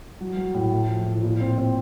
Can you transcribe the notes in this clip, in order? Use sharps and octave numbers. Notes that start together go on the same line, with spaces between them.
F#3
F#3
A2
A3
F3
A2
A#2
C4
C4